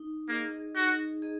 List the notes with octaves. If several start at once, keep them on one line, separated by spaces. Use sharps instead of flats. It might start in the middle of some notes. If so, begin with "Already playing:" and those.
Already playing: D#4
A#3 G#4 D#5
D#4 F#4
G#4 D#5